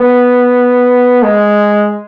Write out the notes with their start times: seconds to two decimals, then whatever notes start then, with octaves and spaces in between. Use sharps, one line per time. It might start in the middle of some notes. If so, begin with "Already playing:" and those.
Already playing: B3
1.23 G#3